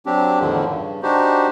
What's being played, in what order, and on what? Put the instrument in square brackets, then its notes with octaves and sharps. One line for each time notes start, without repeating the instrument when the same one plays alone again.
[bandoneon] F#3 C4 D4 G4
E2 A2 D3 D#3 F3
G2 C#3
D4 D#4 F#4 G4 C5